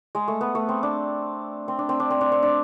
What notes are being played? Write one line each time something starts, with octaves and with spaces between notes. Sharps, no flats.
G#3
A3
B3
A3
C4
D4
C4
D4
C4
D4
C4
D4
C4
D4